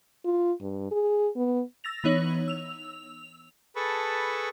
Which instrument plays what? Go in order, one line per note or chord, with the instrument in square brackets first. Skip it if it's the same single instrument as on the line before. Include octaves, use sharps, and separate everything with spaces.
[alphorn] F4
G2
G#4
B3
[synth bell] E6 A6 A#6 F7
E3 B3 D#4 C#5 F#7
E6 F7
[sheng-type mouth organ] G#4 A4 B4 A5 B5 C#6